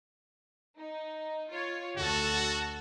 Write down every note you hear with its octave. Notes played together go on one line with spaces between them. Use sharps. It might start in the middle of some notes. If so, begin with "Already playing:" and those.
D#4
F4 C#5
D2 F#4 A4 A5